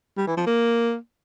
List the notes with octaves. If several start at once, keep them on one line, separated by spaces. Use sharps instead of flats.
G3
E3
F3
A#3